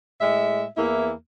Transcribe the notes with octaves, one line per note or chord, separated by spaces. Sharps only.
A2 G#3 E5
E2 E3 A#3 E4 E5